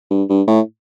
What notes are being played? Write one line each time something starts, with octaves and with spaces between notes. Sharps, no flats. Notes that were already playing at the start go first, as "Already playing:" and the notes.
G2
G2
A2